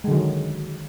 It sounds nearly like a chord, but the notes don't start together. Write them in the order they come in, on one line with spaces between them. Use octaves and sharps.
G#3 D3 F#3 D#3